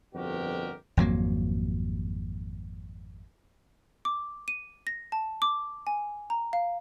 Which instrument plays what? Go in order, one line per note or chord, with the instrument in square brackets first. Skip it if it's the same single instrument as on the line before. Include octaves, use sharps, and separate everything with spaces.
[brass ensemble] G1 F2 B2 F#4 G4 A#4
[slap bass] G#1 F2 F#3 A#3
[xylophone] D6
D#7
A#6
A5
D6
G#5
A#5
F5